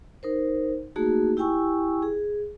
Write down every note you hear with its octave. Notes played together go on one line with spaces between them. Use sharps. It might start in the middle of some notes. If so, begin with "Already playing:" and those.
D#4 A#4 C5
A3 A#3 D#4 F#4 G#4
E4 G4 G5 G#5 C#6 E6
G#4